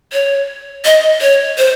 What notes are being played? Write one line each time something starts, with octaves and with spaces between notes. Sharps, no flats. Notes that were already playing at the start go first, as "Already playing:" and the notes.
C#5
D#5
C#5
C5